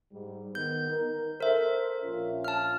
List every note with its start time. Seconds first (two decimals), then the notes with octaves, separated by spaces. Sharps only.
0.12 G#2 G3
0.55 D#3 B3 G6
0.91 D#4 A#4
1.40 A4 A#4 C5 E5
2.03 A#1 C#4 F4
2.44 A5 F6